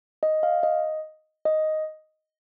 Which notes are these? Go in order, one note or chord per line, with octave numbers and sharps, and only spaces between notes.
D#5
F5
D#5
D#5